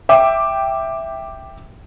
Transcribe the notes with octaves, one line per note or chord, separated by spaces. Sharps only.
E5 G5 D6